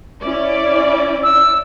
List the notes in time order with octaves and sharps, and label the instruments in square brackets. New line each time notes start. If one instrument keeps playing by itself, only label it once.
[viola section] C#4 E4 D5
[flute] E6